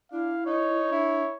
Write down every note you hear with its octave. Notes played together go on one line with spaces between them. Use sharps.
D4 E4 F5
D#4 C#5
D4 E4